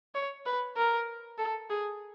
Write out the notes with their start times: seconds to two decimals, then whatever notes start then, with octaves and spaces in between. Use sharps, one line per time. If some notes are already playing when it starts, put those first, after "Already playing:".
0.15 C#5
0.46 B4
0.77 A#4
1.38 A4
1.69 G#4